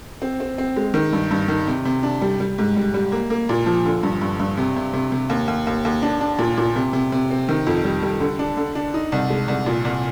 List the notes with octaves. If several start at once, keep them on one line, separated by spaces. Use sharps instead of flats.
C4
C4
C4
G#3
D#3
G2
G2
D#3
C3
C3
D4
G3
G3
G#2
G3
G3
A#3
A#3
A#2
F3
D3
G2
G2
G2
C3
C3
C3
C3
D#2
D#2
D#2
D#2
D4
D4
A#2
A#2
C3
C3
C3
C4
D#3
F2
G3
G3
D3
D4
D3
D4
D#4
C2
G#3
C2
A#2
C2